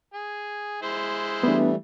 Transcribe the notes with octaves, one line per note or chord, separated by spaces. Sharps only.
G#4
G#3 E4 C5
E3 G3 A3 B3 D4